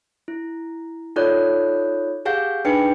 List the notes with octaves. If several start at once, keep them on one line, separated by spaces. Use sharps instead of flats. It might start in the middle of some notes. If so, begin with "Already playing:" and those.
E4
D#4 F4 A4 C#5 D5 F#6
G4 G#4 F5 F#5 G6
D4 D#4 G#4 B4 G5 C#7